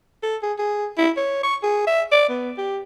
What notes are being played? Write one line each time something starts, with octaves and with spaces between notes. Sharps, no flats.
A4
G#4
G#4
E4
C#5
C#6
G#4
E5
D5
B3
G4